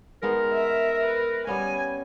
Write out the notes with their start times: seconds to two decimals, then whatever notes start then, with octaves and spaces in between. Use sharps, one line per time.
0.23 G#3 B3 D#4 A#4
0.53 E5
1.05 B4
1.47 G3 B3 C#4 G#5